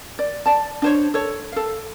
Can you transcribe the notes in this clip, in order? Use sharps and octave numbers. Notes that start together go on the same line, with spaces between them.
D5
D5 A5
D4 C5 C#5
A4 C#5
A4 F5